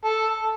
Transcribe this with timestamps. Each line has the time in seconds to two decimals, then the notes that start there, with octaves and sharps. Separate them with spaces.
0.04 A4